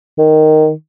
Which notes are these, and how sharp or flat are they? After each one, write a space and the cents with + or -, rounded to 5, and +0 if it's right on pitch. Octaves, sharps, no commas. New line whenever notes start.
D#3 -5